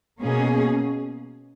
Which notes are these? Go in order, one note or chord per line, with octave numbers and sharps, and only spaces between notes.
B2 A#3 C#4 G#4